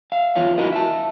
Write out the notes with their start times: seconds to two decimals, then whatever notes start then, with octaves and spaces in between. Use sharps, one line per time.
0.12 E5 F5
0.35 E2 F4 C#5 F5
0.58 D4 E4 F#4 A#4 D#5
0.73 E5 A5